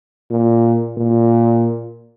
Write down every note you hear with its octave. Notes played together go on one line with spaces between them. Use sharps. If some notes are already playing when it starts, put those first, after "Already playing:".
A#2
A#2